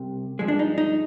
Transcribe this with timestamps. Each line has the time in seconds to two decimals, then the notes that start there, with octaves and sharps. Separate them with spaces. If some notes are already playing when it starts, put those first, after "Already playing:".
Already playing: C2 C3
0.39 G2 F3 G#3
0.48 D4
0.59 D#4
0.78 D#4